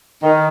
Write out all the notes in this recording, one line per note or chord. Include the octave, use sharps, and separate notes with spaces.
D#3